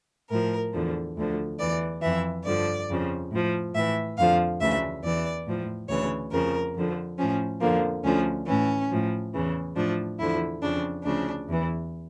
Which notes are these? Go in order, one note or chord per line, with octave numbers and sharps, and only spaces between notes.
A2 F3 A#4
E2 D3 F3
D2 D3 F3
E2 E3 D5
F2 E3 E5
G2 D3 F3 D5
F2 C#3 F3
A2 F3
A2 E3 E5
F2 D3 F3 F5
D2 C#3 E3 E5
E2 E3 D5
A2 F3
D2 C#3 E3 C#5
F2 C#3 F3 A#4
F2 D3 F3
A2 F3 C#4
F2 D3 F3 A#3
D2 D3 F3 C#4
A2 E3 C#4
A2 F3
E2 C#3 E3
A2 F3 D4
E2 D3 F3 E4
F2 C#3 F3 D4
D2 C#3 F3 D4
E2 E3